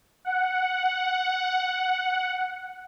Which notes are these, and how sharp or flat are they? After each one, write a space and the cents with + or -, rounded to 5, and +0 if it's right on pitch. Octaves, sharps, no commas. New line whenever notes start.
F#5 +0